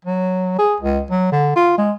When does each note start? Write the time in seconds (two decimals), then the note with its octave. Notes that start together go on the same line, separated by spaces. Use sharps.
0.05 F#3
0.59 G#4
0.80 C#2
1.11 F#3
1.32 D3
1.56 F4
1.78 G#3